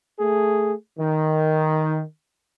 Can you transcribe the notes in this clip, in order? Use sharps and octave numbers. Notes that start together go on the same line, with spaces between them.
A3 G#4
D#3